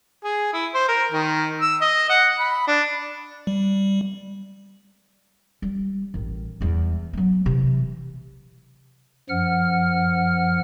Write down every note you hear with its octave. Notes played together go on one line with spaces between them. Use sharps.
G#4
E4
C5
A#4
D#3
E6
D#5
F#5
B5
D4
G3
G3
A1 D#3
E2 G3
F#3 B3
C3 E3
F#2 F3 F#5 F6